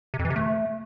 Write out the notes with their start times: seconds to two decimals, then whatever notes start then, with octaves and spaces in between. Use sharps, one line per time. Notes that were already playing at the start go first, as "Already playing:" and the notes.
0.14 C3
0.19 F2
0.25 E3
0.30 C3
0.36 A3